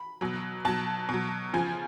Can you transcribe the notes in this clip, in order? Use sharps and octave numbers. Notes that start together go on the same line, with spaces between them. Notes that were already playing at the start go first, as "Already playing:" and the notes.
Already playing: B5
B2 F#3
B2 F#3 A5
B2 F#3
C#3 F3 G#5